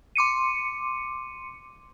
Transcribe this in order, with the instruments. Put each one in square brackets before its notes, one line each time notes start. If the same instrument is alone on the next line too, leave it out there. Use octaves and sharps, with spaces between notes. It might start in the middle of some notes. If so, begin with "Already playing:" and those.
[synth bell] C6 D6 C#7 D#7